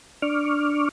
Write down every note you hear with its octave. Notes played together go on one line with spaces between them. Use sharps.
D4 C#6 D6 F6